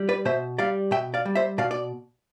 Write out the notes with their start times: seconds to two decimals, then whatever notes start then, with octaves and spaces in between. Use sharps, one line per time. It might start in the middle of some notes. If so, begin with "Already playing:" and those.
Already playing: G3
0.09 B4 D5
0.25 B2 C5 E5
0.58 G3 D5 F5
0.91 B2 E5 G5
1.14 D5 F5
1.25 G3
1.35 C5 E5
1.58 B2 D5 F5
1.71 D5